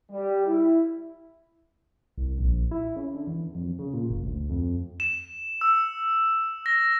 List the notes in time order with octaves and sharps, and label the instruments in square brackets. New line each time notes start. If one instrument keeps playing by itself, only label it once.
[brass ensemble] G3
E4
[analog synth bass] C2
A#1
E4
C#3
D3
E2
F2
C#3
A#2
F#1
D2
F2
[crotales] E7
E6
A#6